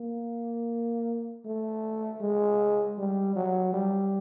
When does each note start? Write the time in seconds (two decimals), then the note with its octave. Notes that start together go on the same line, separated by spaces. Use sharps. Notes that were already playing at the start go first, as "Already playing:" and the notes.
Already playing: A#3
1.45 A3
2.21 G#3
2.98 G3
3.36 F#3
3.74 G3